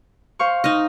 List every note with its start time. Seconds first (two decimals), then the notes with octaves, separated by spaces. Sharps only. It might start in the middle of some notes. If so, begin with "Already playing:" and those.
0.39 C5 F5 C#6
0.64 D#4 D#5 F6